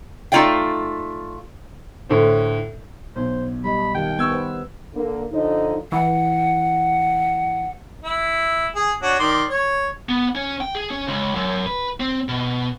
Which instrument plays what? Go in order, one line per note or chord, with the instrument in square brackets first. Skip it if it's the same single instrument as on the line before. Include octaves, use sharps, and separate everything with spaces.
[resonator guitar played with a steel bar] A3 D#4 F4 D5 F5 G5
[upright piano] A2 D3 C5
[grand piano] B1 [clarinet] C5
[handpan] G3 D#5 [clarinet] B5
[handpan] D#3 G4 F5 [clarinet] G5
[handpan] B3 [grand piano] C#6 E6 G#6
[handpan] B4 C5
[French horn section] D3 A#3
D3 F3 D#4
[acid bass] E3 [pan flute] F#5
[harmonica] E4
G#4
D4 F#4 C#5
D#3 D5 C6
C#5
[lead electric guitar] B3
C#4
G5
G#4
C#4
C#2
F#2
B4
C4
B2